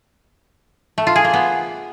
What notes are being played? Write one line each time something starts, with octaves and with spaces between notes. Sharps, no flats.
A3
F4
G#4
A#3
B3